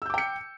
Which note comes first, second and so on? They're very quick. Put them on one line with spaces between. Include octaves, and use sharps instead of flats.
E6 G6 D6 G5 C#7